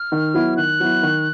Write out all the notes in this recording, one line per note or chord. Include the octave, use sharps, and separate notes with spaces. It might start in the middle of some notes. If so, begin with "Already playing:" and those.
Already playing: F6
D#3
F#3 B3 E4
D#3 F#6
F#3 B3 E4
D#3